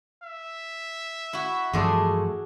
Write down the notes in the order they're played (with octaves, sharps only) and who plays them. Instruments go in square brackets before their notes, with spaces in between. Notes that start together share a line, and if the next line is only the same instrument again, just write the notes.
[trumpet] E5
[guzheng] E4 F#4
[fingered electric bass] G2 E3 F3 [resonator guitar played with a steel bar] G#3 A3 [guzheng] D4 G#4